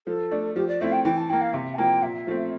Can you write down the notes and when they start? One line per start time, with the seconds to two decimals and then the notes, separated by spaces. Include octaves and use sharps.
0.07 F3 A4
0.31 A3 D4
0.55 F3 G4
0.68 D5
0.81 A3 C4 E4 E5
0.92 G5
1.04 E3 G5
1.17 A5
1.29 A#3 E4 G5
1.41 F5
1.53 C3 E5
1.74 A5
1.78 F3 A#3 E4 G5
2.02 A#2 E5
2.27 F3 A3 C4